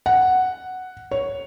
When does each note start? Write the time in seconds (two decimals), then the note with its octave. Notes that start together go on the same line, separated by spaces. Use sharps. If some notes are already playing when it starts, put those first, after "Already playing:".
0.06 F#5
1.11 C#5